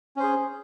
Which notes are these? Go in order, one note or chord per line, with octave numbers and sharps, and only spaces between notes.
C#4 G#4 C5